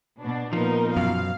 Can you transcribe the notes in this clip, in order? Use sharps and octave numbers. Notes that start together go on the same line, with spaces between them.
B2 D4
A#2 F3 B3 D#4 A#4
F#2 B2 F5